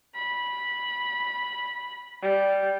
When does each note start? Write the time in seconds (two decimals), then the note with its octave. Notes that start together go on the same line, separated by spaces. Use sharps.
0.15 B5
2.22 G3